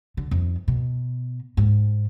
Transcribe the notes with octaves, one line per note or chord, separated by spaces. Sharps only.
D3
F2 D#3
B2
G#2